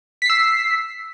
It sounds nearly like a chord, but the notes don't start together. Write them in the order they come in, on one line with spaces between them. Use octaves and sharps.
B6 C7 E6